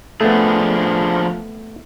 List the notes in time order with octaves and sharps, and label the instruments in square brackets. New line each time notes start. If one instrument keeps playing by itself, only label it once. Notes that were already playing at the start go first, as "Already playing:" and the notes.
[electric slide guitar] F3 D4 G#4 [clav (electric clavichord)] A3 B3